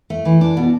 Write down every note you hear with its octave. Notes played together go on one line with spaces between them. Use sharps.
A3
E3
D4
B2